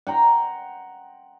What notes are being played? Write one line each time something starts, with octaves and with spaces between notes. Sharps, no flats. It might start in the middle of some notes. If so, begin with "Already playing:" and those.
F#5 G5 A#5 C6